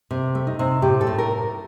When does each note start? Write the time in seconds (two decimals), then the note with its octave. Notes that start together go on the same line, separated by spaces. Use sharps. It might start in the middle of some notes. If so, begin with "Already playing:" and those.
0.11 C3
0.35 A3
0.47 D#4
0.59 C3
0.82 A2 G4
1.01 A4
1.07 A2
1.18 A#4